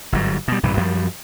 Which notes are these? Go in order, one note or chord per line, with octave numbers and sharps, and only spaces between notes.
G1 G#2 F#3
B2 G3
A#1 G2 C3 E3
F#2 F3 G3